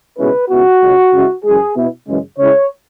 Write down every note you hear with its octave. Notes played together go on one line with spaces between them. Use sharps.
C#2 B2 G#3 C#4 E4 B4
C#2 B2 B3 E4 F#4
C#2 C#3 G#3
C#3 G#3 C#4 E4
F#2 E3 G#3 G#4
B2 B3 E4
F#2 C#3 E3 G#3
C#3 G#3 E4 C#5